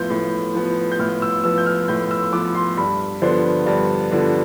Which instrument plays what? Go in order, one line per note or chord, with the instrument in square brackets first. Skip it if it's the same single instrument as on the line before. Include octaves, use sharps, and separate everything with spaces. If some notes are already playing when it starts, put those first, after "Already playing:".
Already playing: [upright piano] A2 F3 B3 G6
A2
F3 B3
G6
A2 F6
E6
F3 B3 E6
G6
F6
A2 G6
E6
F3 B3 D6
C6
G2 B5
D3 F3 B3 D4 C5
G2 D5
D3 F3 B3 D4